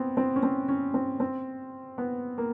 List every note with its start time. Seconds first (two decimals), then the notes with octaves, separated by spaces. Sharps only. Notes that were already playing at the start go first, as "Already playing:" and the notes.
Already playing: B3 C4
0.17 C4
0.36 C#4
0.43 C4
0.69 C#4
0.94 C4
1.20 C4
1.98 B3
2.38 A#3